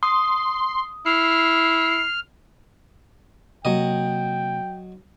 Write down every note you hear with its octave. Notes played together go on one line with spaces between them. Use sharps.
C6 D#6
E4 F6 C7
C3 F#3 A#3 D#5 G5